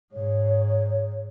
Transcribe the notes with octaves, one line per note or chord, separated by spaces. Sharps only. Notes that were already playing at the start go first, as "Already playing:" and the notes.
G#2 C#5